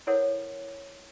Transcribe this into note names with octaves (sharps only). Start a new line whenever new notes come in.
E4 A4 A#4 C5 C#5 F#5